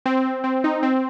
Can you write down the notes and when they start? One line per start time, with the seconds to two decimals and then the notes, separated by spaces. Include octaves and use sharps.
0.06 C4
0.26 C4
0.44 C4
0.64 D#4
0.83 C4